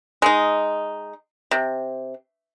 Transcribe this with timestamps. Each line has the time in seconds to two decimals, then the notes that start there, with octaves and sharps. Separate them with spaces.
0.22 G#3 D#4
1.51 C3